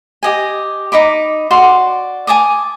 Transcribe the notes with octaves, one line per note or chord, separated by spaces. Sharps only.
G4 D#5 G#5
D#4 D#5 B5 D6
F#4 D5 C6
G#5 A5 D6 D#6